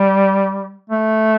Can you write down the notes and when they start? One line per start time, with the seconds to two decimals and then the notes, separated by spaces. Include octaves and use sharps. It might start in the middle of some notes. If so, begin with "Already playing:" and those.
Already playing: G3
0.90 A3